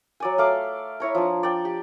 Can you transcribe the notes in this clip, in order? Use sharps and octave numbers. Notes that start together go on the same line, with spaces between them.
F#3 D5 G#5
A3 F5 D6
E4 C#5 A#5
F3 D4
D5 G5
G4